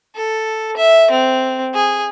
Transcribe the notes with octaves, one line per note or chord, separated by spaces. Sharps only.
A4
E5
C4
G#4